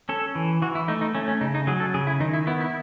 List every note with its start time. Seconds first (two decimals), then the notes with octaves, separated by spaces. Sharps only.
0.09 C#4 A4
0.35 E3
0.62 E3 F#4
0.75 E4
0.88 A3 D#4
1.01 D#4
1.15 A3 C#4
1.28 C#4
1.41 C#3 D#4
1.55 D#4
1.67 F#3 G#4
1.80 A4
1.94 C#3 G#4
2.07 E4
2.20 D#3 D#4
2.33 E4
2.47 B3 E4
2.60 E4